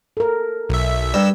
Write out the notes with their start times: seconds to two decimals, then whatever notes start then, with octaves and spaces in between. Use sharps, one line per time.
0.17 A4 A#4
0.70 B1 E5
1.14 G2 E6